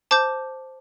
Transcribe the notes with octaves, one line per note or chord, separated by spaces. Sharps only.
C5 A5 D6 G6